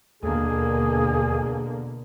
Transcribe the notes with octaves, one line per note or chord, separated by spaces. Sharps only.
D#2 B2 D3 A#3 G#4 A4 G#5